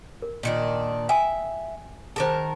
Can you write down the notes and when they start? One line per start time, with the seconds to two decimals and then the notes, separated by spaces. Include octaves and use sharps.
0.22 A#4
0.43 A#2 D#3 D4
1.09 E5 G5 G#5 D#6
2.16 D#3 G#4 A#4 C5 A5